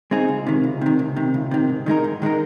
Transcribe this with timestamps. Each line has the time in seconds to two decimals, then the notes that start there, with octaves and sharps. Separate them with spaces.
0.11 G#3 C4 D#4 G#4
0.28 C#2
0.47 C3 D#3
0.64 C#2
0.81 C3 D#3
0.99 C#2
1.16 C3 D#3
1.34 C#2
1.51 C3 D#3
1.69 G#2
1.86 D#3 G#3 D#4 A#4
2.04 G#2
2.22 D#3 G#3 D#4 A#4